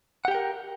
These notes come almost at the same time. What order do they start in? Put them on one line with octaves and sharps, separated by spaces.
F#5 G4 G5 A#4